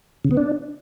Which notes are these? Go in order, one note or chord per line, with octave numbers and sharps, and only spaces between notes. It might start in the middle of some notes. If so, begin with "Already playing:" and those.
C#3
B3
D4